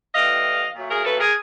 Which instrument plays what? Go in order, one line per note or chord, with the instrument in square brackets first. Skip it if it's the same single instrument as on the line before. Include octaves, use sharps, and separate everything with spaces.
[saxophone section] A2 E3 G3 D#5 F5
A#2 F#3 A3
G#4 A#4
A4 B4
G#4 A#4